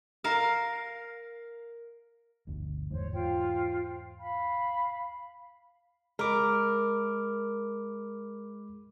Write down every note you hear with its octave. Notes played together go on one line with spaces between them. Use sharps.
A#4 F5
G1 D2
E2 G#2 C5 C#5
F4 C5 G5
F5 B5
G#3 A#4 B5 D6